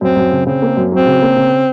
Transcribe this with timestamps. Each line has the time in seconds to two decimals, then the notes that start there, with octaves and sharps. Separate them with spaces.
0.01 F#2 C4
0.16 F#2
0.32 C#3
0.46 C#3 C4
0.62 A#3
0.77 F#2
0.92 F#3 C4
1.07 C#3
1.22 A#3
1.36 C#3